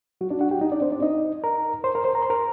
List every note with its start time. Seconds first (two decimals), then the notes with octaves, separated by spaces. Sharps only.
0.21 F#3 F#4
0.30 D4 D5
0.41 F#4 F#5
0.51 G4 G5
0.61 D#4 D#5
0.72 D4 D5
0.81 C4 C5
0.92 D4 D5
1.02 D#4 D#5
1.44 A#4 A#5
1.84 C5 C6
1.95 A#4 A#5
2.04 C5 C6
2.15 A#5
2.22 C6
2.30 A#4 A#5